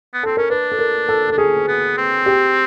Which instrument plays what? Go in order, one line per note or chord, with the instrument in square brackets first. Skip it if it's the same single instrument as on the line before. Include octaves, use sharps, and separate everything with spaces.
[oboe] B3
[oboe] C4 [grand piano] A4
[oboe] C#4 [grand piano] A#4
[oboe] D4 [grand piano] B4
[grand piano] A4
A#4
A4
[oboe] D4 [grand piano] A4
[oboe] C#4 [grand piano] G#4
[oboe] B3
C4
[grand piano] G4